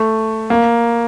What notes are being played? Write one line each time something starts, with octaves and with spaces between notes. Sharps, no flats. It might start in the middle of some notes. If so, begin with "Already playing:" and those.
Already playing: A3
A#3